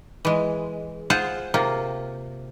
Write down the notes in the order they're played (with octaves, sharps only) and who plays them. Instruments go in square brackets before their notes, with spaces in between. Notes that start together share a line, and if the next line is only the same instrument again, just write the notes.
[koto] E3 G#3
F4 G#4 C5 F#5
C3 A#3 F4